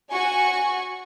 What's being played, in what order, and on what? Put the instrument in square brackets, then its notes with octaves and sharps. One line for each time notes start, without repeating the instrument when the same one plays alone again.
[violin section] F#4 G#5 C#6